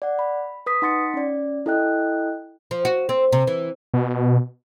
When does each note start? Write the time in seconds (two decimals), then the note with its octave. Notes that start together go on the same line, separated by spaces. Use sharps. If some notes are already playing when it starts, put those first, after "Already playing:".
0.02 D5 F#5
0.19 B5
0.66 B4 D#6 B6
0.82 D#4 F#5 C6 A6 B6 C#7
1.14 C#4 D5
1.66 E4 A4 D#5 G5 F#6
2.71 F3
2.85 F#4
3.09 C4
3.32 C3
3.47 E3
3.94 B2